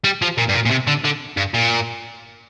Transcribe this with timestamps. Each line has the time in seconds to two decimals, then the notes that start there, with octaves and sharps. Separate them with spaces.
0.04 G3
0.22 F3
0.38 A#2
0.49 G2
0.54 A#2
0.66 A#2
0.70 C3
0.87 D3
1.04 D3
1.37 G2
1.54 A#2